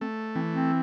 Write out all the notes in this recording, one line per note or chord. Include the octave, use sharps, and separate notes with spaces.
A3 C4
E3 C4
C4